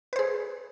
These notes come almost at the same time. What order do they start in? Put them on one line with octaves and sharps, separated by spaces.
B4 C5 G#4